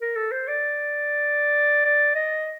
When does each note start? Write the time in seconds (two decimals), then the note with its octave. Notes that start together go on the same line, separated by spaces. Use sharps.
0.02 A#4
0.16 A4
0.32 C5
0.48 D5
1.85 D5
2.15 D#5